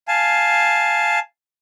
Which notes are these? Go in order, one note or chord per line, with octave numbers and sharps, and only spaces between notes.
F5 G#5 A5